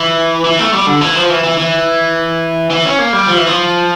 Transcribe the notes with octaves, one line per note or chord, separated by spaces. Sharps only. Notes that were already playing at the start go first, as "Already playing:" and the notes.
Already playing: E3
E3
A3
G3
D3
E3
F3
E3
E3
E3
E3
C#4
A#3
G3
F3
E3
F3